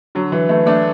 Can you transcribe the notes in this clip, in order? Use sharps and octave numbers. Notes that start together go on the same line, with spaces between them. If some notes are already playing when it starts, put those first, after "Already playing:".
D3 F#3
E3
E3 A3
A3 D4